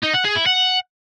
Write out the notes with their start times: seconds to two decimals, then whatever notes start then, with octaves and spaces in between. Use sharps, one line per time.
0.03 D#4
0.14 F#5
0.24 G#4
0.35 E4
0.46 F#5